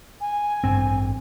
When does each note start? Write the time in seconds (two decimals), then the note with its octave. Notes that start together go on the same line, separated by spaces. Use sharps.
0.20 G#5
0.64 A1 G2 C4